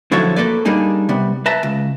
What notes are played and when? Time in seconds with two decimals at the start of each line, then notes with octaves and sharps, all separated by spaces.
0.12 D3 F3 F#3 E4 A4 C#5
0.36 A3 A#3 A4 B4 D5
0.65 G3 A#3 D4 D#4 G#4
1.09 C3 G3 B3
1.46 B4 E5 A5 A#5
1.63 C#2